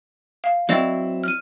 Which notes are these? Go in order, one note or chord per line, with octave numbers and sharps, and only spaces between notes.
F5
F#3 C4 E4 C5 D5 D#5
F6 D#7